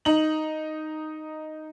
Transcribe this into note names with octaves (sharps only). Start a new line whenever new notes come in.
D#4 F#7